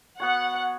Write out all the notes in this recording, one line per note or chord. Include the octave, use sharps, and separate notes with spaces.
B3 F#4 C#5 F#5